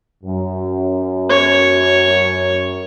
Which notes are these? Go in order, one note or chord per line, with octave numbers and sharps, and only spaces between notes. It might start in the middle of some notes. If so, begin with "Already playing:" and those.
F#2
C#5